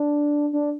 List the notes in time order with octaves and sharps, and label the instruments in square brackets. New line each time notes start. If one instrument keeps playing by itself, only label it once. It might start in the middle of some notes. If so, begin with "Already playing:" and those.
Already playing: [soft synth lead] D4
D4